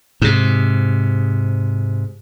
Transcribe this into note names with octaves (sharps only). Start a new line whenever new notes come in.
G#2 C3